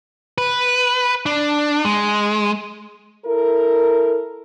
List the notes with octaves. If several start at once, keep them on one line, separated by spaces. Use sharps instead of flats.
B4
D4
G#3
E4 A4 A#4